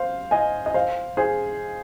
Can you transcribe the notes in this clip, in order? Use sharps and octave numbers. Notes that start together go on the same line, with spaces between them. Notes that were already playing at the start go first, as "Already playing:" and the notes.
Already playing: C5 F5
D#5 G#5
D#5
C5 F5
G#4 C5